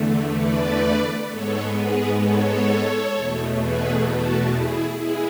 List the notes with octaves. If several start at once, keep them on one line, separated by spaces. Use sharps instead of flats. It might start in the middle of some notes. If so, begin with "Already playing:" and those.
Already playing: E2 D3 A3
B4 D5
G#2 G#3 B3 A4 C#5
G#4 B4
A4 C#5
E2 B2 A3
G#4 B4
F#4 A4
E4 G#4
G#3 B3 E4 G#4